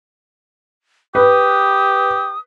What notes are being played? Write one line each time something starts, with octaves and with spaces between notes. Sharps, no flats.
G4 B4 D#6